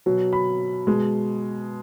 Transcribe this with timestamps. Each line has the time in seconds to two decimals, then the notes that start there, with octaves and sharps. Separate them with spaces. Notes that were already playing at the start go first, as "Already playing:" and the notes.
0.06 B2 F#3
0.33 B5
0.87 B2 G#3